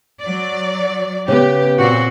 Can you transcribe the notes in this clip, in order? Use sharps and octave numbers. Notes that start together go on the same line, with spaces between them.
F#3 D5
C#3 B3 G4
A#2 C4 F#4